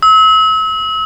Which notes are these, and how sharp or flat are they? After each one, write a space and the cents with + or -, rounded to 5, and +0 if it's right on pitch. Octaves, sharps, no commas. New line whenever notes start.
E6 -35